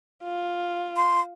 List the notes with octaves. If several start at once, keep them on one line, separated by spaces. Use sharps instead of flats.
F4
C6